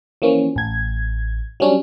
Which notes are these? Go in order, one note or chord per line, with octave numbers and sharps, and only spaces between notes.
E3 F3 A#3 C#4
A1 G#6
F#3 G3 C#4 D4